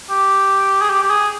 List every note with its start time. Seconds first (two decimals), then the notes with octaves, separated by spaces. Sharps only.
0.10 G4
0.82 G#4
0.90 G4
1.02 G4
1.10 G#4